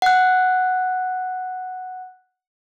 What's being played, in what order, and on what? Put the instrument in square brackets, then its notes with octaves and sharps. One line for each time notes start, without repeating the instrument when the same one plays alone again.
[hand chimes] F#5 F#6